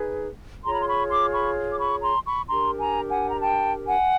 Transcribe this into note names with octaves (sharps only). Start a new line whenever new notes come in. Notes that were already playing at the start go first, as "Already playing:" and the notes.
Already playing: D#4 G#4 B4
F4 G#4 C#5 A#5 C6
B5
C6
B5 C#6
C6 D6
B5 C#6
D6
B5 C#6
A#5 C6
B5 C#6
D4 G4 A#4 A#5 C6
G#5 A#5
F#5 G#5
A#5
G5 A5
F#5 G#5